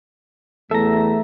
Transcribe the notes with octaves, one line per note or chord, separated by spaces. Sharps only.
E2 A3 A4 E5 A#5